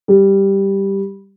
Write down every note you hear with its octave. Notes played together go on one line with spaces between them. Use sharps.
G3